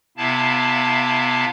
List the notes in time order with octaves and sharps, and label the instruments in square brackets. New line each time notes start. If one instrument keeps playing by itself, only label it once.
[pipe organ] C3 B3 E4 F5 A5